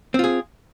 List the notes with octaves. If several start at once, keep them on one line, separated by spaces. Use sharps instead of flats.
C4 F4 G#4